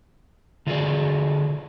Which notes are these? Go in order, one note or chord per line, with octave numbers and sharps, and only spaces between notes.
D3 F4 F#4 G#4 D5